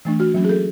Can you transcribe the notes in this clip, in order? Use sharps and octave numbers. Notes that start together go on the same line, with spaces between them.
E3 A3 D4
F#4
F#3 A#3 C#4
G#4
A4